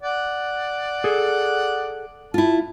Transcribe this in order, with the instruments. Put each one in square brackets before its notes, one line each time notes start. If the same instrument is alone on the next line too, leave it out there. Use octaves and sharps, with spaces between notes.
[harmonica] D5 F#5
[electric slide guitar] G#4 A4
[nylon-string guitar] E4 F4 [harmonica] A5